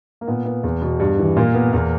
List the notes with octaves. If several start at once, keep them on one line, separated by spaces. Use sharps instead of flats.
A#3
A#2 B3
B3
E2
B2
G2
E3
A#2 A#3
B3
E2 A#3